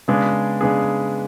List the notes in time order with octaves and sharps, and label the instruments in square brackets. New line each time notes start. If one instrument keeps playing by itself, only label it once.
[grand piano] C#3 G#3 B3 D4 G#4
C#3 G#3 B3 D4 G#4